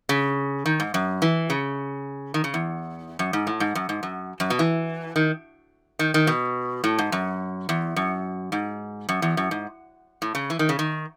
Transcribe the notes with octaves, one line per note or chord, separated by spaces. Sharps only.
C#3
D#3
G#2
F#2
E3
C#3
D#3
C#3
E2
F#2
G#2
A2
G#2
F#2
G#2
F#2
F#2
B2
E3
D#3
D#3
D#3
B2
A2
G#2
F#2
E2
F#2
G#2
F#2
E2
F#2
G#2
A2
C#3
E3
D#3
C#3
D#3